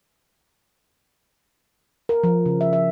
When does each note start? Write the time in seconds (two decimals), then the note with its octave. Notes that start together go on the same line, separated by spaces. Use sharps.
2.09 A#4
2.24 F3
2.46 C#3
2.61 E5
2.73 E5